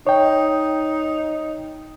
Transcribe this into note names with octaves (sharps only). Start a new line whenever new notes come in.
D#4 C#5 G5